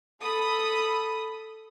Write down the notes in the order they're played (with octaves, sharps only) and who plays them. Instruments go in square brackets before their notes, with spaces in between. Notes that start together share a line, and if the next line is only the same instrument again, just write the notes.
[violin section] A4 B5 D#6